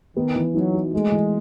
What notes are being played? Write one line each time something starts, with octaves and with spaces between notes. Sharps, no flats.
D#3 B3
E3
F#3 D#4
F#4
G#3 A3
E3